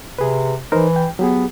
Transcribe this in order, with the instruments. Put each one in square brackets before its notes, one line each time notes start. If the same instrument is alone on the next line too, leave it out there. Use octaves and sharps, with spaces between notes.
[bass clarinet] C3 [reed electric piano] G#4 B4
[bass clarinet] E3 [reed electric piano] D#4 A#4 C5
[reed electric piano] G5
[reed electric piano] F#3 G4 G#4 [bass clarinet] B3